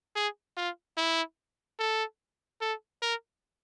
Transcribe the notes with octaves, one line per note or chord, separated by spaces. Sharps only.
G#4
F4
E4
A4
A4
A#4